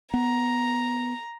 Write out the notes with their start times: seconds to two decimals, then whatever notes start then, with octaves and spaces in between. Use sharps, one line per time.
0.14 B3 A#5